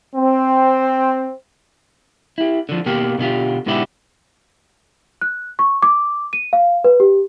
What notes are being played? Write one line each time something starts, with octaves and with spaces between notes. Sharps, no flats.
C4
E4 G4
D3 F3
B2 A#3 G4 A#4 G5
B2 D3 E4 F4 G4
G#2 B2 D3 B3 E4 G4
F#6
C#6
D6
D#7
F5
B4
G4